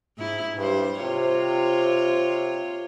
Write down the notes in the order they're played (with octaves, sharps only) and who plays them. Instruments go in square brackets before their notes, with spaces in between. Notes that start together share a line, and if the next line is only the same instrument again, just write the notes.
[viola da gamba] G#2 E4
[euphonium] G2 [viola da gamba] G3 C5
[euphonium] C3 [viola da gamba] F4 C#5